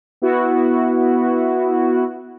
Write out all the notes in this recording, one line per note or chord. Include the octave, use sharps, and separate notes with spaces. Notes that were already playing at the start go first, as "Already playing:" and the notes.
B3 E4 F#4